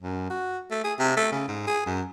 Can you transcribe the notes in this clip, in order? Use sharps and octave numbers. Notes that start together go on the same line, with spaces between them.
F#2
F#4
A3
G#4
C3
A3
C#3
G#2
G#4
F#2